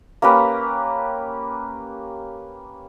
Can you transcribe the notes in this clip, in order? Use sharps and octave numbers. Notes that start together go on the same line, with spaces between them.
A#3 C#4 G4 B4